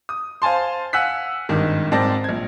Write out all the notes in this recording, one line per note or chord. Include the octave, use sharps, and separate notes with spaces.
D#6
C5 F5 G#5 A5 C6
F5 F#5 G#5 E6 F#6 B6
G#1 G2 D#3 G#3
G#2 C4 D5 A5 A#6
A#1 G#6